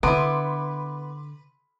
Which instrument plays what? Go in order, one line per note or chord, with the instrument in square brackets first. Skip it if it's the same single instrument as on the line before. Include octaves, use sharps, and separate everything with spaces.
[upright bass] D3 D4 [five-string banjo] B3 E4 [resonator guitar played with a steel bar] B4 [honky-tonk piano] C6 D6 D7